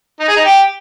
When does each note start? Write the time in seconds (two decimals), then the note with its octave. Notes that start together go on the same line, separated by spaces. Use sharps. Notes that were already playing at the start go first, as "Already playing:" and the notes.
0.20 D#4
0.28 G#4
0.37 D#4
0.45 G4